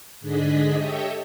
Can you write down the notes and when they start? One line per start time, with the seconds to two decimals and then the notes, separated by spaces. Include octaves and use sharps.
0.21 G#2 D3 D4 G#4 D#5 B6
0.76 G4 A4 C#5 D#5 E5 G5